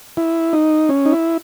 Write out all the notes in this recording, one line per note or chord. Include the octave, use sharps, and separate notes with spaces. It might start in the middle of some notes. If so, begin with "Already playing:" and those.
E4
D#4
C#4
D#4
E4